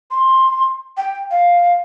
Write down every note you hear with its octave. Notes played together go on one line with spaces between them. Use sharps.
C6
G5
F5